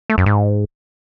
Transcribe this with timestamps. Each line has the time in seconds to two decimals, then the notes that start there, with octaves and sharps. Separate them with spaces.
0.10 A3
0.18 F#2
0.26 G#2